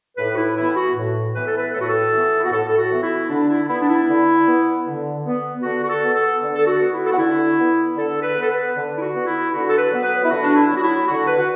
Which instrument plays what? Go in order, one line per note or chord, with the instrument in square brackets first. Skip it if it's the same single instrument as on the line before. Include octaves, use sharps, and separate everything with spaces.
[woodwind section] A2 B4
F#4
E4
E3 B3 E4
F#4
A2
E3 B3 B4
A4
B4
A2 A4
F#4
A4
E3 B3
E4
F#4
A2 A4
A4
F#4
E3 B3
E4
D3 D4
E4
B3 E4
D4
E4
D3
B3
D3
B3
D3 F#4
F#4
A4
B3
A4
D3
A4
F#4
B3
E4
A4
F#4
D3 E4
B3
D3 A4
B4
B3
A4
B4
D3
E4
F#4
B3
E4
D3 F#4
A4
B4
F#3 B3
B4
E4
D3 F#4
D4
E4
F#3 B3
F#4
E4
D3 F#4
B4
F#4